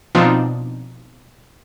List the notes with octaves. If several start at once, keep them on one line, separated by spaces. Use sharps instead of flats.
B2 F3 C4 D4 D#4 F4